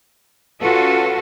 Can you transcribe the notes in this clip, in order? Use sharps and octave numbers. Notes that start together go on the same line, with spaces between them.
C#4 F4 F#4 A4 B4